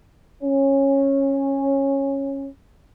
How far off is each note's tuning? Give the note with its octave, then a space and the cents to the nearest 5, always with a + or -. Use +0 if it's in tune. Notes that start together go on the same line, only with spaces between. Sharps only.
C#4 -15